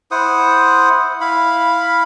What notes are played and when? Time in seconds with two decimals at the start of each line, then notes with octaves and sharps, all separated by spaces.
0.11 E4 C5 F#5 D#6
1.21 E4 F5 B5